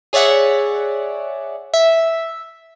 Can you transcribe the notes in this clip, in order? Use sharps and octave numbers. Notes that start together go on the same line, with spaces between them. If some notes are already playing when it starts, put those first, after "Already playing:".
G#4 C#5 D5 E5 F#5
E5